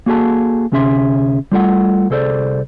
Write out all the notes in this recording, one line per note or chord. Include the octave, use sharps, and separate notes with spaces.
A#3 F#4 G#4 A4 A5
D2 C3 C#4 G#4 E5 C6
G3 A3 F4 A4 C5 F#5
C2 G#4 A4 C5 D5